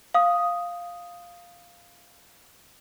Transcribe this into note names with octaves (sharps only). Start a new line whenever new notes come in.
F5 D#6